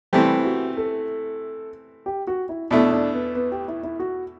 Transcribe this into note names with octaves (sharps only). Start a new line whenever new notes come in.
C3 E3 G3 A3 C4 G4
F#4
A4
G4
F#4
E4
E2 B2 A3 D4 E4
D4
B3
B3
G4
E4
E4
F#4